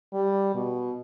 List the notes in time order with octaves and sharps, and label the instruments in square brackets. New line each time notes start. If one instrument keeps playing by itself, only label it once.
[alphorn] G3
B2